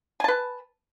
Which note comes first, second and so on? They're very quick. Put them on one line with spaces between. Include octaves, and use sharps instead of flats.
G#5 A5 B4